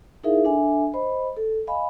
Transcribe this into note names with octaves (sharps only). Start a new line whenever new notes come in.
D#4 E4 G#4 A#4 E5 F5
D4 A4 E5 G#5
C5 D#5 B5
A4
D#5 F5 G#5 B5